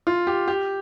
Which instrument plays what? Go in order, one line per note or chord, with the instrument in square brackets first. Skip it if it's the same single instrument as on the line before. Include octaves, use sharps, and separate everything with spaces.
[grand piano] F4
G4
G4